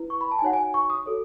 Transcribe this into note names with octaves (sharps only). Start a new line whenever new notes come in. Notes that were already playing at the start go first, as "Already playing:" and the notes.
Already playing: E4 B4
C#6
B5
A5
G#5
D#4 F#4 C#5 F#5
G#5
C#6
D#6
F#4 A4 C#5